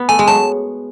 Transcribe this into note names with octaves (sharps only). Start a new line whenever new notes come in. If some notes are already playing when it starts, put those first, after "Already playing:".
Already playing: B3
A3 G#5
G#3
F#3 A5